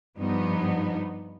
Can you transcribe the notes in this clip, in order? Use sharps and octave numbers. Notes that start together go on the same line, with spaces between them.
G2 F3 B3 D#4